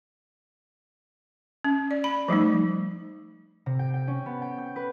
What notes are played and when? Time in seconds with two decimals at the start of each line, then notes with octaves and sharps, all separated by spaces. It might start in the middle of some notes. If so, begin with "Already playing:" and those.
1.64 C#4
1.91 D5
2.04 B5
2.28 F3 G3 A3 D#4
3.66 C3
3.79 G5
3.94 G5
4.08 C#4
4.26 B3
4.42 G5
4.58 G6
4.76 B4